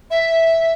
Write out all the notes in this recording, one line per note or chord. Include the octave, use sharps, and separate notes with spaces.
E5